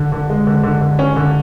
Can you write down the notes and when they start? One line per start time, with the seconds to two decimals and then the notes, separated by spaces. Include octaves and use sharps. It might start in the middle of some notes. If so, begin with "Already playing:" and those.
Already playing: D3
0.12 D3
0.29 G#3
0.47 D3
0.63 D3
0.81 D3
0.99 C#4
1.16 D3